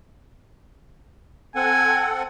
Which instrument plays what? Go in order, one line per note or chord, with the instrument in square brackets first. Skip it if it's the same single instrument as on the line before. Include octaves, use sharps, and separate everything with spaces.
[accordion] C4 A4 F#5 [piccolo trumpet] G#5